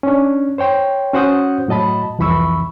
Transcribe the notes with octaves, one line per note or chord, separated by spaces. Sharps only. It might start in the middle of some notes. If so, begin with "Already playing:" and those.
C#4 D4
C5 C#5 G5 C6
C#4 F#4 C5 F#5 D#6 G6
A2 F#3 D#5 A5 B5
C2 F2 E3 B5 C#6 E6